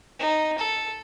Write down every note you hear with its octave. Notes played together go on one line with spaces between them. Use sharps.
D#4
A4